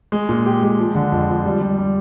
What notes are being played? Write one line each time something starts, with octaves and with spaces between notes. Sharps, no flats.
G#3
A#2
G4
G#3
F3
D3
F2
F3
G3
G3
G3